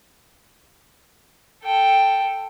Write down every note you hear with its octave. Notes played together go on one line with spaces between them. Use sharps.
A4 G5